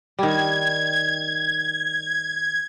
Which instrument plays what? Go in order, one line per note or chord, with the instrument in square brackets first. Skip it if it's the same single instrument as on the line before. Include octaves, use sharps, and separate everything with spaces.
[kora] D#3 G3 [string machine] G#6